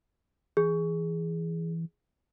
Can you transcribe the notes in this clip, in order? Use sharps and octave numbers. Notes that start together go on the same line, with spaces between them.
E3 G#4